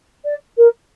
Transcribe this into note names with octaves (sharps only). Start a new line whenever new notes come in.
D5
A#4